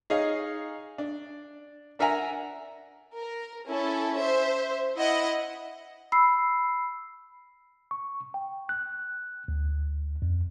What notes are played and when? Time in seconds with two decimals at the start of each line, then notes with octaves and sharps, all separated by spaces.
0.10 D#4 G#4 C#5 D#5 F5
0.98 D4
1.99 D4 A#4 E5 F#5 G#5 A#5
3.17 A#4
3.67 C#4 E4 A4
4.18 C5 E5
4.98 E4 D#5 F#5
6.12 B5 E6 C7
7.91 C#6
8.34 G5
8.69 F#6
9.48 D2
10.22 F2